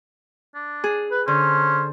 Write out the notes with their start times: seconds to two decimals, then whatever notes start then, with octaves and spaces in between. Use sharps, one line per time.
0.55 D4
0.84 G#4
1.11 B4
1.28 D3 C#4 C5